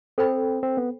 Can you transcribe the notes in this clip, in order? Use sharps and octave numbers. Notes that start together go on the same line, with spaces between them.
C4 A4 C5 G5 B5
C4
B3